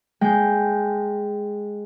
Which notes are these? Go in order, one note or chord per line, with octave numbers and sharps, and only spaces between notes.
G#3 G5